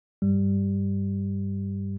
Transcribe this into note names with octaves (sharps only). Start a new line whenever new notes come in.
G2 G3